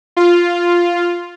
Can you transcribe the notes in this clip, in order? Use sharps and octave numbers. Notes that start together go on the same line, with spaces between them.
F4